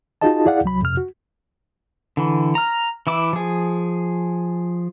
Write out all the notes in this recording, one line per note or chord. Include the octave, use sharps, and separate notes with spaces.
D#4 F4 F#4 G#4 D#5 A5
E4 G#4 D5 F5 F#5
C2 F#3 B5
F2 C3 F6
F#4
D3 E3
A#5 F6
E3 E4 D6
F3 G#4